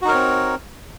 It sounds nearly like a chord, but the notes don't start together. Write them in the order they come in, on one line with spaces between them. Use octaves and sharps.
F#4 D#4 A#4 C#5 C4